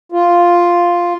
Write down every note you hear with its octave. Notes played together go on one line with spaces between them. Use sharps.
F4